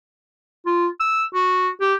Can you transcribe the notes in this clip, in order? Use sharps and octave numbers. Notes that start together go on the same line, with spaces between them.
F4
E6
F#4
G4